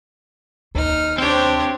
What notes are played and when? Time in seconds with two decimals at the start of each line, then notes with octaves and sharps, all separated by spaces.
0.75 D#2 D#4 F6
1.18 C4 D4 G4 C5 C#5 G5